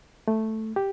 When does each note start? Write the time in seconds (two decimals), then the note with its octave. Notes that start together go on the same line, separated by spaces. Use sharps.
0.28 A3
0.76 G4